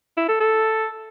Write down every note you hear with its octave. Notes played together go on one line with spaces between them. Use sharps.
E4
A4
A4